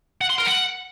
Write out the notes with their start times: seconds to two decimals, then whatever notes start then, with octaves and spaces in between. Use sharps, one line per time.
0.21 F#5
0.30 C6
0.38 A#4
0.47 F#5